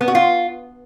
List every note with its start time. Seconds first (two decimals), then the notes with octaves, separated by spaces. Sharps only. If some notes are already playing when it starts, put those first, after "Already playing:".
0.01 B3
0.08 F#4
0.15 F4